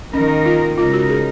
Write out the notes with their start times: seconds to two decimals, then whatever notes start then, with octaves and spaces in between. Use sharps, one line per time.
0.14 D#3 A#3 C#4 D#4 A#4
0.46 F4
0.78 C#3 G#3 D#4 F4 A#4
0.93 F#4
1.09 G#4